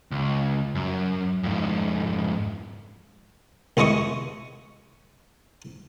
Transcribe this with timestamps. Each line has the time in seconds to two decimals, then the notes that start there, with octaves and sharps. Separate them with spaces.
0.12 C#2
0.75 F#2
1.43 F2 G#2
3.77 C2 G#3 E4 D#5 C#6 D#6